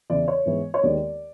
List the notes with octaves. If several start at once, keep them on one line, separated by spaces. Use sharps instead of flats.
E2 C#3 E3 D5
C#5
G#2 E3 G#3 B3
C#5
D#2 D#3 G#3 B3 D5